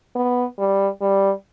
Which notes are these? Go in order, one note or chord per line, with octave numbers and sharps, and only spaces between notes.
B3
G3
G3